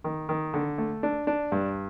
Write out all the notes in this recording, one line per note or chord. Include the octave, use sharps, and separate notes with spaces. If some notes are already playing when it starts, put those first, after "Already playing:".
D#3
D#3
D3
A3
D4
D4
G2